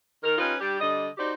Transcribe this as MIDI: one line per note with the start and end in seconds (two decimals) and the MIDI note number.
0.23 0.37 51
0.23 0.37 70
0.38 0.54 61
0.38 0.54 63
0.38 0.54 65
0.38 0.54 67
0.38 0.54 71
0.59 0.78 55
0.59 0.78 62
0.59 0.78 67
0.79 1.07 50
0.79 1.07 55
0.79 1.07 75
1.18 1.31 63
1.18 1.31 66
1.18 1.31 67
1.18 1.31 72
1.18 1.31 74